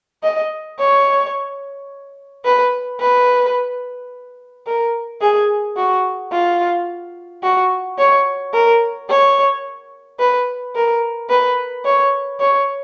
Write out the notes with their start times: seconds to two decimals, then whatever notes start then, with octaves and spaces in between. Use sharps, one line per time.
0.23 D#5
0.79 C#5
2.45 B4
3.00 B4
4.67 A#4
5.21 G#4
5.77 F#4
6.32 F4
7.43 F#4
7.98 C#5
8.53 A#4
9.09 C#5
10.20 B4
10.75 A#4
11.30 B4
11.85 C#5
12.40 C#5